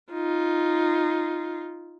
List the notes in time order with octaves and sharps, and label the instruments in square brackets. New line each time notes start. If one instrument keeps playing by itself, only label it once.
[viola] D#4 F4